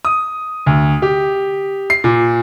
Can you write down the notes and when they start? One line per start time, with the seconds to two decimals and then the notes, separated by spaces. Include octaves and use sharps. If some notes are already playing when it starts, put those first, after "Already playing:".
0.05 D#6
0.66 D2
1.02 G4
1.90 C7
2.04 A#2